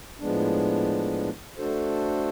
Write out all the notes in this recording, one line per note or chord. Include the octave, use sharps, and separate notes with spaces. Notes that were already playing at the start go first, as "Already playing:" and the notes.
A2 F3 G#3 B3 D4
A3 D4 F#4 A4 C5